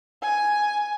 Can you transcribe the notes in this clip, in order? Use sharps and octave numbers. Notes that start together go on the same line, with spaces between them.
G#5